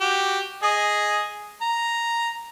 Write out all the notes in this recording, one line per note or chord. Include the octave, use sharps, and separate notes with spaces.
F#4 G4
G#4 D#5
A#5